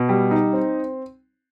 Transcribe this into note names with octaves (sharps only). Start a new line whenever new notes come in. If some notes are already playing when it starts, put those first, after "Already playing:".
Already playing: B2
G3
D#4
C4